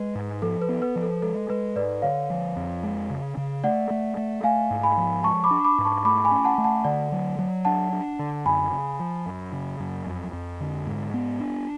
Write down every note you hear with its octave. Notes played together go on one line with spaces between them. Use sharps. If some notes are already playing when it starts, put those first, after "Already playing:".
Already playing: G#3 B4
G#2
F3 A4
B4
B3
B4
F3
A4
G#3 A4
G#3 B4
G#2 B4 D5
D3 C#5 F5
F3
F2
G#3
C#3
C#3
A3 D5 F#5
A3
A3
A3 F5 G#5
G#2
G#5 B5
F3
G#3 A5 C#6
B5 D6
D4
B5 D6
G#2
A5 C#6
A3 B5 D6
G#5 B5
C#4
F#5 A5
A3
F#5 A5
D3 D5 F#5
F#3
F#3
D4 F#5 A5
D4
D3
F#2 G#5 B5
C#3
F3
F#2
C#3
F#2
F2
F2
D3
G#2
B3
D4